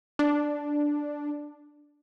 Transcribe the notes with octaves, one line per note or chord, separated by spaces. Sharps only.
D4